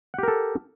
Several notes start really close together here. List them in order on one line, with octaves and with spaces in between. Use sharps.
F#5 G4 A#4 A4